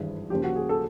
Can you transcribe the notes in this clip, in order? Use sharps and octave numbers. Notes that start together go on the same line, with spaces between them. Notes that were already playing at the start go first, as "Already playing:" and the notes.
Already playing: G#1 G2 E3 G#4
D#2 C#3 F3 G4
F#4
G#4
A4